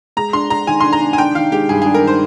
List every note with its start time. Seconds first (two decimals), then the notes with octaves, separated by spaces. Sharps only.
0.17 G#3 A#5
0.33 D4 C6
0.50 D4 A#5
0.67 D#3 G#5
0.80 D4 C6
0.93 A#5
1.01 D4
1.13 G#5
1.18 D4 G5
1.35 D#3 F5
1.52 G#3 G4
1.69 G2 G#4
1.82 D4 G#4
1.94 A#4
2.03 D#3 C5